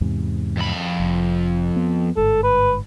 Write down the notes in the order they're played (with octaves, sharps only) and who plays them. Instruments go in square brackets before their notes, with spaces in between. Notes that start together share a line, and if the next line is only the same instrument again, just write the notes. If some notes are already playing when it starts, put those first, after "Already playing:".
[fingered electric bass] E2 G#2 C3
[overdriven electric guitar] F2 B5
[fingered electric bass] F1
B3
[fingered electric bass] G1 G#2 [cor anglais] A4
[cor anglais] B4